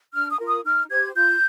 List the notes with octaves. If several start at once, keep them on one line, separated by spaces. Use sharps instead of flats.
D4 F6
D#6
F4 A#4
D#6
D#4 F6
G4 C5 G#6
F4 G6